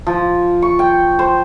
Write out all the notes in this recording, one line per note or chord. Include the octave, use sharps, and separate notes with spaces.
F3
C#6
G5
C5